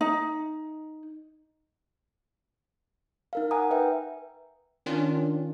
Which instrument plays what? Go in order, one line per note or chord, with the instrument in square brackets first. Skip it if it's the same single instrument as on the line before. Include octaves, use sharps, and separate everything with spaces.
[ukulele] D#4
[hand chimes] D#4 A#4 F5
F#5 G#5 A#5 D#6
B4 E5 G5
[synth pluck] D#3 C#4 D4 F4